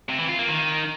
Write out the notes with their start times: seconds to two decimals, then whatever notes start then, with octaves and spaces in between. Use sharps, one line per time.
0.09 C3
0.19 E3
0.29 F4
0.39 A#3
0.48 D#3